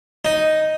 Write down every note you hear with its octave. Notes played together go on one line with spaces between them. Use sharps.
D#4